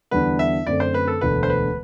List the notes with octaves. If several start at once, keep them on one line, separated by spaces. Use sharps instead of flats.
E2 D3 G3 B3 D4 B4
E5
F#2 D3 A3 C4 D5
C5
B4
A4
E1 D2 D3 A3 B4
C5
B4